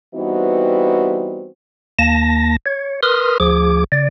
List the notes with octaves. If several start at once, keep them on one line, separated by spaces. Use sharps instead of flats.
E3 G3 B3 C4 D#4 F#4
D#2 A#3 A5 A#6
C#5
A#4 B4 C6 D#6 F6
D2 F3 G#4 D6
C#3 D5